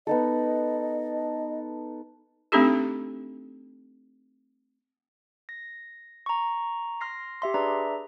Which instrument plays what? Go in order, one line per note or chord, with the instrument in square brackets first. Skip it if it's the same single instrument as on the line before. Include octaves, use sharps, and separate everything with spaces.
[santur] B3 D#4 A4 [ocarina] D#5
[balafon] A3 C4 D4 D#4 G4 A4
[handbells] A#6
A#5 C#6
C6 F6 A#6 C7
G4 E5 C6
D4 G#4 B4 D5 E5 A#5